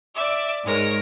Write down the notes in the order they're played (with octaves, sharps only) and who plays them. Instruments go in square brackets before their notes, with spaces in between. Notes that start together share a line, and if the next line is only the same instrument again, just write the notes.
[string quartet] D5 E5 D6
G#2 G#3 A#4 C#5 A#6